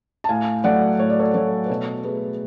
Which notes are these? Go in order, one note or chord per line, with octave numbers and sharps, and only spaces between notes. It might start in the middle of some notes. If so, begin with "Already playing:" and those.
A5
A2 F5 G#5
F#3 A3 D5 F#5
A2 C#5
D5
A4 C#5
F#3 A3 A4 C#5
B4
B2 A4 C#5
A3 G#4 B4